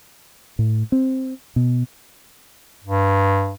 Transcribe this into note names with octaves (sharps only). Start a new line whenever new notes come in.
A2
C4
B2
G2